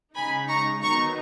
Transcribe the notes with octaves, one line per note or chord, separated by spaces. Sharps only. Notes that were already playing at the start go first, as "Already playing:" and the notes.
C#3 G#3 D#4 G#5 B5
A#5 C#6
D#3 F#3 B3 D#4 A#5 C#6